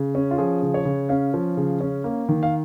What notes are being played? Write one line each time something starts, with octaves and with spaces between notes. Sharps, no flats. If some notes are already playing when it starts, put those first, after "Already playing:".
Already playing: C#3
C#4
F4
F3 G#4
C#3
C#5
C#3
C#4 F5
F3
C#3
C#4
A#3
D#3
F5